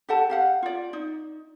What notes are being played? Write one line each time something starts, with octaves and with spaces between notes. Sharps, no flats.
G4 A4 F#5 A5
G4 F5 F#5
F4 D5
D#4